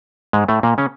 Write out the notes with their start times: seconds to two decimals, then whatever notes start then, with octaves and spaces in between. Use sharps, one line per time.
0.33 G#2 G#3
0.48 A2 A3
0.63 A#2 A#3
0.78 C#3 C#4